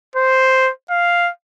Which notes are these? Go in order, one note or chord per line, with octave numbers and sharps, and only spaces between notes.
C5
F5